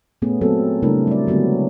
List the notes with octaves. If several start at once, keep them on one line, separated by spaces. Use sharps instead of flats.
A#2 A3 B3 C#4 G#4
F#3 A#3 C4 A4
C#3 G3 A3 D4 E4 A#4
G3 D5
D3 F#3 G#3 B3 C#4